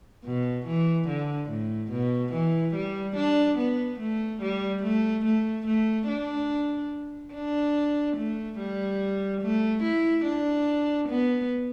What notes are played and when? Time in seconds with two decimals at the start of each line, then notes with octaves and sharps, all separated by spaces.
0.25 B2
0.66 E3
1.08 D3
1.50 A2
1.92 B2
2.33 E3
2.75 G3
3.17 D4
3.58 B3
4.00 A3
4.41 G3
4.83 A3
5.25 A3
5.66 A3
6.08 D4
7.34 D4
8.17 A3
8.58 G3
9.42 A3
9.83 E4
10.25 D4
11.09 B3